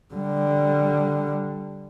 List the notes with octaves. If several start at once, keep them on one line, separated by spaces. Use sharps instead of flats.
D3 G3